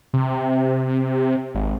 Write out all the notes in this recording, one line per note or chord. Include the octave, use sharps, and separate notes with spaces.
C3
G#1